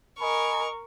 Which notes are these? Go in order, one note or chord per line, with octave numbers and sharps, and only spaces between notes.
A#4 D#5 G#5 B5 C#6